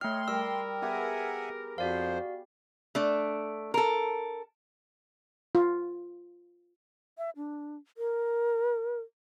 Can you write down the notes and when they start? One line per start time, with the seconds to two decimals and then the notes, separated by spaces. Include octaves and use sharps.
0.01 A3 C#5 D#5 G5 C6 F6
0.28 G3 A#4 E6
0.82 B3 G4 G#4 E5 F#5 G#5
1.78 F2 F3 F#4 C5 D5 F5
2.95 A3 D4
3.74 A4 A#4
5.55 F4
7.18 E5
7.37 D4
7.98 A#4